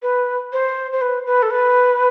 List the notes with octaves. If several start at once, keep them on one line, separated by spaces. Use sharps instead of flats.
B4
C5
C5
B4
B4
A4
B4